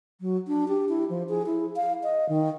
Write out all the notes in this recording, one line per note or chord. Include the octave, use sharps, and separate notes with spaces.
F#3
D4
G4
E4
F3
G#4
E4
F5
D#5
D#3